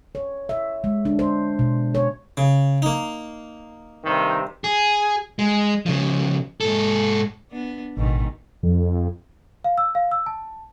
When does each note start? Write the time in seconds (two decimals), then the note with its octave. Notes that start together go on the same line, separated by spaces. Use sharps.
0.15 C#5
0.49 E5
0.84 G#3
1.05 D4
1.19 C5
1.59 B2
1.95 C#5
2.37 C#3
2.82 A#3 D#4
4.05 G2 C3 D#3
4.64 G#4
5.39 G#3
5.86 C#3 F3
6.61 G#2 A4
7.50 B3 D4
7.97 A1 G#2 B2 D#3
8.63 F2
9.64 F5
9.78 E6
9.95 F5
10.12 E6
10.26 A5